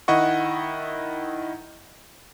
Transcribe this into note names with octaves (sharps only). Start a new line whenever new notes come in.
D#3 E4 D#5 F#5 C#6